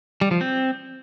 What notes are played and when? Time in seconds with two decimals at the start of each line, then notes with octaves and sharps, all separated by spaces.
0.21 G3
0.31 F3
0.41 C4